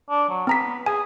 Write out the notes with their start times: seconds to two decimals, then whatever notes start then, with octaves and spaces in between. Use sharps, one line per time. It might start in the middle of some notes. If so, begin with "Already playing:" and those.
0.10 D4
0.29 F#3
0.47 B3 C4 A#5 B6
0.86 G#4 G#5